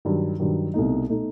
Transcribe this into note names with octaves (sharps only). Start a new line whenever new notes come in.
G2 D#3 F#3
G2 D#3 F#3
C2 B2 A3 D#4
B2 A3 D#4